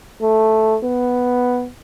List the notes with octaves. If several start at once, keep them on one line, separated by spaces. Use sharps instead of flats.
A3
B3